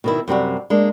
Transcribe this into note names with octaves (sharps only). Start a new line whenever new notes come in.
B2 D#3 E4
F#2 C3 G3 F#4
G#3 A#3 D4